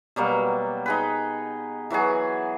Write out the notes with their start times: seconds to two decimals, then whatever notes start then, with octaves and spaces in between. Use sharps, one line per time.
0.16 B2 F#3 G3 A#3
0.86 D#4 G#4 B4
1.90 E3 F#3 F#4 G#4